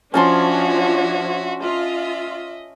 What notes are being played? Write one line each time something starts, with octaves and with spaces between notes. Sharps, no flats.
F3 C#4 D4 F#4 C#5 E5 A5 C6
F4 D#5 E5